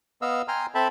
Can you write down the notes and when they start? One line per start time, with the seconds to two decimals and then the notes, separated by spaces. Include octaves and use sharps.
0.22 B3 D#5 F5 E6
0.48 G5 G#5 A#5 C6 F6
0.75 C4 A4 E5 G5 A5 B5